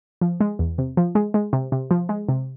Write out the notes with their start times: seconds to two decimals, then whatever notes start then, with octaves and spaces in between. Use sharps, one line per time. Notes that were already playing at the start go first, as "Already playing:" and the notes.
0.21 F3
0.41 G#3
0.59 E2
0.78 C3
0.97 F3
1.15 G#3
1.34 G#3
1.53 C3
1.72 C3
1.91 F3
2.09 G#3
2.29 C3